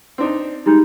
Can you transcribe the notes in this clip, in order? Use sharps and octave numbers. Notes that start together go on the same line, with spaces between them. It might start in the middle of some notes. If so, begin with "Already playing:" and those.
C4 D4 D#4
G3 G#3 D#4